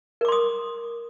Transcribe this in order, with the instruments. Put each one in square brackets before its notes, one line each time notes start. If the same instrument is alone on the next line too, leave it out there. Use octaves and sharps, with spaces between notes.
[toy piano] A#4
D6
C6
D#6